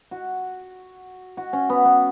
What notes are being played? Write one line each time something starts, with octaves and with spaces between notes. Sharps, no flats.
F#4
F#4
C#4
B3
B3